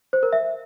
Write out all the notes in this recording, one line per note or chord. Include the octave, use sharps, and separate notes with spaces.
C5
A#4
E5